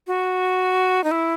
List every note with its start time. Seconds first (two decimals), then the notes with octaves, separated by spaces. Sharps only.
0.07 F#4
1.04 D#4
1.11 E4